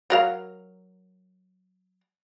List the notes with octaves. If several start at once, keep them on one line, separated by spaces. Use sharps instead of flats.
F#3 A#4 F5